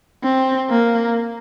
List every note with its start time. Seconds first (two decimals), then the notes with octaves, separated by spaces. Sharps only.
0.24 C4
0.70 A#3